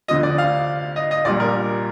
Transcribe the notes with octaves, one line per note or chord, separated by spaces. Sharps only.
D2 D3 F3 D#5
D5
F5
D#5
D#5
A#1 A#2 G3 D5
A#4